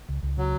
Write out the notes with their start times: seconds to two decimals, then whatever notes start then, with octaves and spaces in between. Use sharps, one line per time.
0.09 C#2
0.23 C#2
0.37 C#3 F#3